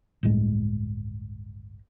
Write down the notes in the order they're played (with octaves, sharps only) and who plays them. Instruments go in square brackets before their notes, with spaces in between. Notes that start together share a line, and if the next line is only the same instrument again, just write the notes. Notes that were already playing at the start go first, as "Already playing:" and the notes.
[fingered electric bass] G1 C#2 A2 G#3